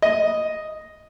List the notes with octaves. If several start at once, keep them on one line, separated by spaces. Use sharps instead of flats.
D#5